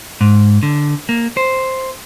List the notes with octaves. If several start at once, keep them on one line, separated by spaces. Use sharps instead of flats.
G#2
D3
A#3
C5